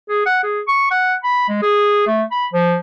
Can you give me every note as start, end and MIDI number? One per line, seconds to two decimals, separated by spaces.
0.09 0.21 68
0.26 0.39 78
0.43 0.60 68
0.68 0.90 85
0.91 1.14 78
1.24 1.46 83
1.49 1.59 56
1.62 2.05 68
2.07 2.23 57
2.31 2.45 83
2.54 2.77 53